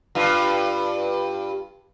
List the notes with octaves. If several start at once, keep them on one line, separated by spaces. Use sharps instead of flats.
G2 F4